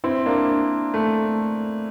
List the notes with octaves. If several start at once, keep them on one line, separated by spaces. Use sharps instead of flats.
C4 E4
A#3 D4
A3